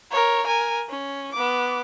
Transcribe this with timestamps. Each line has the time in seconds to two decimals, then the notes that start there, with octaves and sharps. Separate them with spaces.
0.11 A#4 C#5
0.47 A#4 G#5
0.90 C#4
1.33 B3 D6